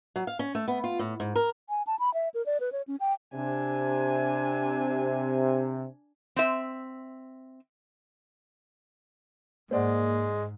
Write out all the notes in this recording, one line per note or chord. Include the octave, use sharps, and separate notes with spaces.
F#3
F5
C#4
A3
B3
F4
A2
G#2
A#4
G#5
A5
B5
E5
A#4
D5
B4
C#5
C#4
G5
C3 D4 G#5
C4 E5
G#2 G#3 A#3 C5 D5 F#5